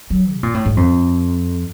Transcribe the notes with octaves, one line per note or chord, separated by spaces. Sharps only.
F#3
C3
A#2
A2
G#2
F2